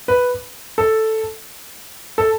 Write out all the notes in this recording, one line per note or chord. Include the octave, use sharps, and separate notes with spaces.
B4
A4
A4